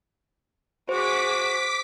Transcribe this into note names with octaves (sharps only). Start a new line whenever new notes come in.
F#4 G#4 C5 D6 B6